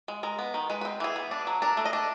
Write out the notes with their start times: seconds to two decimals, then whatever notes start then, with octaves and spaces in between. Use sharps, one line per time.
0.08 G#3
0.23 G#3 A#4
0.39 B3
0.54 D#3
0.70 G#3 B4
0.81 B4
0.85 C4
1.00 E3 G#4
1.16 B3
1.31 D4
1.47 F#3
1.62 D4 A#4
1.77 A3
1.85 D#5
1.93 D4